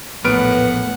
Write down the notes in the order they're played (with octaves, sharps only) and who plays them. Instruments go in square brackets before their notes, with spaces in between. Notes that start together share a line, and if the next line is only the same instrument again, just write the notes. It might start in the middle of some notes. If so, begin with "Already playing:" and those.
[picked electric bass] A#1 [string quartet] E2 A2 F#5 [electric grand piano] B3 F6 D7 [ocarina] B4